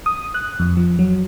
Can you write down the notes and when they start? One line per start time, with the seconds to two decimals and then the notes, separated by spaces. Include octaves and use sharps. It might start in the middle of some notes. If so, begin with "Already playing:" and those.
0.06 D#6
0.34 F#6
0.59 F2
0.77 F3
0.99 F#3